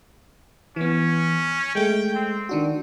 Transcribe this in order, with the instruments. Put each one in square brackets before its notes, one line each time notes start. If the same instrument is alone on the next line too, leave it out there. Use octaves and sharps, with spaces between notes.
[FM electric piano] E3 B3 [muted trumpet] C#4
[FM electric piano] G#3 A3 [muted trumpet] G5
[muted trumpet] C4
[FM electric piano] D#3 D4 F#4